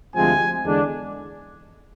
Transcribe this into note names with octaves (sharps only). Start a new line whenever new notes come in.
D2 C3 F3 G#3 C4 G#5
E2 D3 G#3 D4